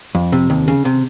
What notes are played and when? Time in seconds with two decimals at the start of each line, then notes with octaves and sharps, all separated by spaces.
0.15 F2
0.32 C3
0.50 D#2
0.68 C#3
0.85 C3